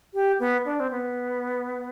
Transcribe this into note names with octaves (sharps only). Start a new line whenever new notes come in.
G4
B3
D4
C4
B3